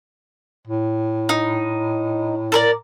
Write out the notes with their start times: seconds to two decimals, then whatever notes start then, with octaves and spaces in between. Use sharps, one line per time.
0.67 A2
1.29 D#4
2.52 A4 A#4 D5